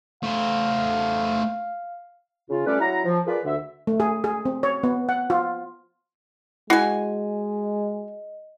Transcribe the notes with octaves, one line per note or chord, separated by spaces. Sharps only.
A3 C5 F5
C#3 F4
G3 A3 C#4 G4 B4 D5
F#3 E4 F#5 A#5
F3
F4 G#4 A#4 B4 D5
D2 D3 E5
A3
G#4
G#4
C4
C#5
B3
F#5
F4
G#3 E4 F#4 D#5 G#5